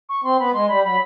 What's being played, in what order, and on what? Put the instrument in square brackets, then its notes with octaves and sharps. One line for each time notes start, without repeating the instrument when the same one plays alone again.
[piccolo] C#6
[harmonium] C4 [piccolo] C6
[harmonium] B3 [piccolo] B5
[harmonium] G#3 [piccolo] C6
[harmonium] G3 [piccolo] B5
[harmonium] F#3 [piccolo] B5